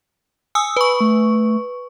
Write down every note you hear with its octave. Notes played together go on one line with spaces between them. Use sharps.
G#5 D#6 E6
B4 B5 C#6
A3